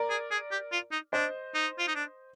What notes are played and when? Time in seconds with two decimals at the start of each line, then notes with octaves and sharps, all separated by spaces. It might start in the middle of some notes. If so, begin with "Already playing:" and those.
Already playing: A#4 D5
0.10 G#4
0.31 G#4
0.51 G4
0.72 F4
0.92 D#4
1.13 D4 C5 D#5
1.54 D#4
1.79 F4
1.88 D#4
1.95 D4